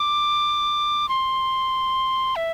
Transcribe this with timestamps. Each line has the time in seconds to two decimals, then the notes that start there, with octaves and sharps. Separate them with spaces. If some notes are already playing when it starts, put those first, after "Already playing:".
Already playing: D6
1.09 C6
2.36 E5